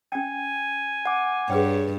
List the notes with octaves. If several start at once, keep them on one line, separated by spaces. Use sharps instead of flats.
C#4 G5 G#5
F#5 D6
G2 G#4 B4 C#5 G5